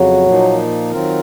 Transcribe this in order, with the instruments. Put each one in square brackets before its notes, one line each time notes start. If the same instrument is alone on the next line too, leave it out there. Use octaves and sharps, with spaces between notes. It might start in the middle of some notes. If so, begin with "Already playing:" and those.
Already playing: [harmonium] F2 C#3 [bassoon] F#3
[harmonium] A#2 F3 A#3 D#4
D#3 F#3 C4 F4 A#4